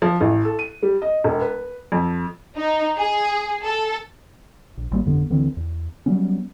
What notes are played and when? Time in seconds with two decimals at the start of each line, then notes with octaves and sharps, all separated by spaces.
0.02 F3
0.21 A1
0.45 A4
0.59 D#7
0.82 G3
1.02 D#5
1.24 E1
1.41 B4
1.92 F2
2.56 D#4
2.97 G#4
3.63 A4
4.77 A#1
4.91 G#1 G3 A#3
5.05 G1 F2 D3 B3
5.30 D2 D3 E3 C4
5.57 E2
6.06 F#3 G3 B3 C#4